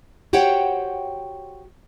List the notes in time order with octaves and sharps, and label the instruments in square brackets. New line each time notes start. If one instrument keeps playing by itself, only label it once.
[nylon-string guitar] F#4 G4 C5 C#5 F#5 G5